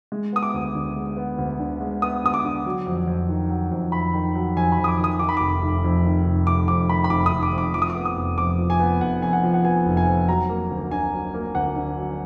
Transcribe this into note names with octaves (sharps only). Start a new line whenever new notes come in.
G#3
B3 D#6
D6
D2
D3
G#3
B3
D2
D3
G#3
B3 D#6
D2 D#6
D6
D3
F#3
F2
F2
D#3
F#3
F2
F2 B5
D#3
F#3
F2 G#5
B5
F2
D#6
D6
D#3
D#6
D#3 D6
B5
F1 D6
F1
F2
D#3
F1
F1 D6
F2 D6
D#3 B5
B5
F1 D6
D#6
F1
D6
F2
D6
F3 D6
D#6
D6
B3
D#6
F1
F2 D6
F3
G#5
B3
F1 F#5
F2 G#5
F#5
F3
F#5
B3 G#5
F1
G#5
F2
F#3 A#5
A#3
D2
D3 G#5
F#3
A#3
D2 F#5
D3
F#3